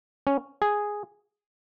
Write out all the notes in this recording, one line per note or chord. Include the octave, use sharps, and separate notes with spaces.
C#4
G#4